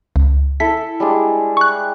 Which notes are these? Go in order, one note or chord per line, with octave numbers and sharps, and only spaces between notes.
C#2
E4 A4 E5 B6
G3 G#3 D4
C#6 F#6